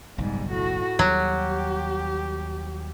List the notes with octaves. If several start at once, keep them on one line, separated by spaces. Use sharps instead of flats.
F#1 B1 G#2 G3
A2 F#4
D#2 F#3 G3 G4